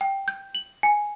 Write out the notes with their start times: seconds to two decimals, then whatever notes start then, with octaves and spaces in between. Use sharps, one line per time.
0.01 G5
0.28 G6
0.55 F#7
0.83 G#5